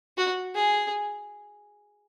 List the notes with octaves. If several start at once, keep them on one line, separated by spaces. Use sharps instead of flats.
F#4
G#4